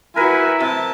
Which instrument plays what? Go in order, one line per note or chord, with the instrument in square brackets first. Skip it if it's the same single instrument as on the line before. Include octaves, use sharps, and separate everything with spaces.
[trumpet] E4 [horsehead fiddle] F#4 G#5 [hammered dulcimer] A#4 B4
[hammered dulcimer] C3 [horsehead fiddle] E5 A5